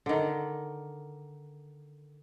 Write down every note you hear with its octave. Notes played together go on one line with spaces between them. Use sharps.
D3 D#3